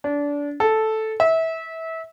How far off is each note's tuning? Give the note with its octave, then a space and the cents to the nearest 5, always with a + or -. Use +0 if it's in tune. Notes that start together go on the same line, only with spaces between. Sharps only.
D4 -25
A4 -5
E5 -25